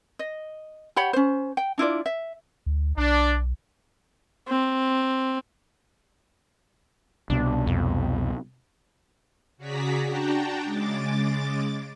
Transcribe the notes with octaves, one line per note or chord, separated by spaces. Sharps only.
D#5
G4 C#5 F#5 B5
C#4 C5
G5
D4 E4 F4 D5
E5
D2
B1 D4
C4
C2 B2 D4
F2
C#3 F#4 G#4 D5 A#5 B6
D4 F#4 G5 A5 A#5
C#3 G#3 D6 A6